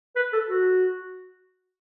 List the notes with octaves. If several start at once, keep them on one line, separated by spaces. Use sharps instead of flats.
B4
A4
F#4